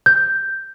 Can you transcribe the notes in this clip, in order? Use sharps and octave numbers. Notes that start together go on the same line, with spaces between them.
G6